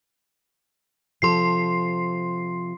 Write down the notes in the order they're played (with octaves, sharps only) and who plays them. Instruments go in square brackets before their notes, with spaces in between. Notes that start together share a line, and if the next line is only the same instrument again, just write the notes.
[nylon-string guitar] C3 F3 A4 [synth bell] C6 C7